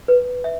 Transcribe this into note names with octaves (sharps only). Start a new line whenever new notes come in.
B4
E5